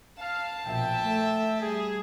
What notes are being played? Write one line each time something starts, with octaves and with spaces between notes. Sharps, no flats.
F5 A5
A#1 B2 E5 G5
A3
G3 G#4